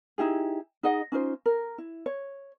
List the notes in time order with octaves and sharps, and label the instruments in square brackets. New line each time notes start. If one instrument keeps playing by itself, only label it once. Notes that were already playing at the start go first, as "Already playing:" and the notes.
[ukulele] D#4 E4 G4 G#4
D#4 G#4 D#5 F#5
C#4 D#4 F4 C5
A#4
E4
C#5